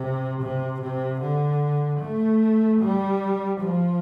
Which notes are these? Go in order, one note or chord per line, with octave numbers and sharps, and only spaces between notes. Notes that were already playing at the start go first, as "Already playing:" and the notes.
Already playing: C3
C3
C3
D3
A3
G3
F3